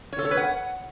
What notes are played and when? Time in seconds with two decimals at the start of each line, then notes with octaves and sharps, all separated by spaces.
0.13 C#5
0.19 A4
0.25 C#5
0.31 B4
0.37 F#5